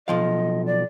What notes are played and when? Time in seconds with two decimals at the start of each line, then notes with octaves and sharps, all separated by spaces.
0.08 B1 F3 D#5 F5
0.66 D5